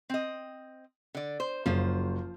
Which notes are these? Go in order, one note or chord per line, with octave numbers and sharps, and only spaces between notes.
C4 D#5
D3 D5
C5
F#1 F3 F4 C5